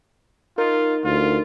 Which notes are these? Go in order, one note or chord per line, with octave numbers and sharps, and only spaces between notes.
D#4 F4 A#4
D2 F4